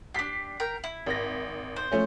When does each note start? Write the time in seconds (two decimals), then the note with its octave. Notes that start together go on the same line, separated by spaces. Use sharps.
0.15 D4 G4 B6 C7
0.60 A#4 G5
0.84 E4
1.06 G#1 A#6
1.76 C5
1.92 F3 A3 C#4